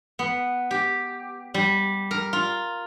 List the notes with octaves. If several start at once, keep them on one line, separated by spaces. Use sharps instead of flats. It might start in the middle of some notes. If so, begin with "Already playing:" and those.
B3
G4
G3
A#4
F4